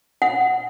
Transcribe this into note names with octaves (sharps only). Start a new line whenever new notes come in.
F#5